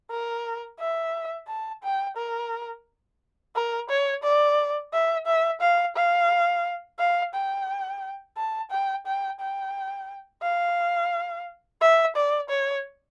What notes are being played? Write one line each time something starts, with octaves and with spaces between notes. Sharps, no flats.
A#4
E5
A5
G5
A#4
A#4
C#5
D5
E5
E5
F5
F5
F5
G5
A5
G5
G5
G5
F5
E5
D5
C#5